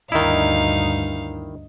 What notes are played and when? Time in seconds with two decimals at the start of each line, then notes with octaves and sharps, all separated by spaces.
0.12 D2 G2 D#3 D#4 E4 D#5 F5